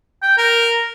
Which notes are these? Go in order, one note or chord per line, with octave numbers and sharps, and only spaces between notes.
G5
A#4